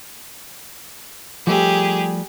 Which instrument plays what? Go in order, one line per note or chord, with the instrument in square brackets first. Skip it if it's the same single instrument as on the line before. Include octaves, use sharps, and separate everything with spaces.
[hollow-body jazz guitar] F3 G3 A3 [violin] G4 G#4